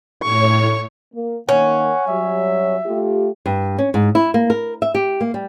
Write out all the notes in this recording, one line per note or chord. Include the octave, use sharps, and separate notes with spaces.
A2 C#5 C#6
A#3
D#3 A#3 C#4 F#5
F#3 G3 E5
A3 F4 G4
G2
C#4
G#2
E4
A#3
A#4
E5
G4
A#3
G3